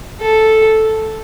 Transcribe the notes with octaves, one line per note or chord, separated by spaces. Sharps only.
A4